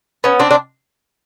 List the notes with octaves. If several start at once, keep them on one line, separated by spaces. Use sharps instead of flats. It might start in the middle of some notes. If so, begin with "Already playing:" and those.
B3 C#4
C4 D4
D4